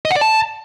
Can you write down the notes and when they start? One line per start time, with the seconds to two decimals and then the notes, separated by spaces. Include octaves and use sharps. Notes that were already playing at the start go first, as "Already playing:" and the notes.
0.05 D#5
0.11 F#5
0.16 D5
0.21 A5